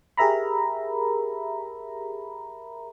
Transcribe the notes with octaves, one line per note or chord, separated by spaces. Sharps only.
G4 G#4 A#4 E5 A#5 B5